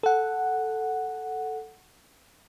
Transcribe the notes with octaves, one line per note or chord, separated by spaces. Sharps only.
A4 F#5